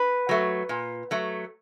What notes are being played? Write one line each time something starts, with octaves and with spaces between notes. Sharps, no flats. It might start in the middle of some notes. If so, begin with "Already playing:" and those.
Already playing: B4
F#3 A3
A#2
F#3 A3